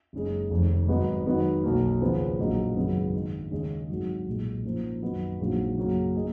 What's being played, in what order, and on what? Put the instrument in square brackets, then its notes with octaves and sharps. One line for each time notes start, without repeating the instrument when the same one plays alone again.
[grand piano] F#1 F#2 C#3 G#3 D#4
F1 F2 D#3
G#1 G#2 F#3 B3 D#4
G#2 D#3 F#3 B3
B1 B2 A#3
D#2 C#3 F3 B3
A#1 G#2 F#3 A#3 D#4
G#1 F#2 C#3 F#3 B3
G#2 D#3 G#3
D#2 C#3 G#3
G#1 G#2 F#3
B1 A#2 G#3
G#2 F3 A#3 C#4
F#2 D#3 F#3 B3 D#4
A#1 G#2 F#3 A#3
F#2 C#3 F#3 A#3
A#3 D#4 G#4